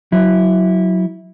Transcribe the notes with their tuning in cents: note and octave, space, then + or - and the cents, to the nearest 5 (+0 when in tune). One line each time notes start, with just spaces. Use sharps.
F#3 +0 E4 -15